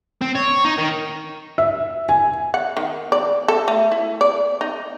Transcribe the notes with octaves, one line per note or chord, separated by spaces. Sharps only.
C4
C#5
D#4
D#3
E5
G#5
F#5
D#3
D5
A4
A3
E4
D5
D#4